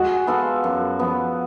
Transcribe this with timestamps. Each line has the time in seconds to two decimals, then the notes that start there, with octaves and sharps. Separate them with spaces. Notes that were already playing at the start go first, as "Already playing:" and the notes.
Already playing: G#3 F#4
0.27 B3 F4 A4
0.64 F#2
0.99 F3 B3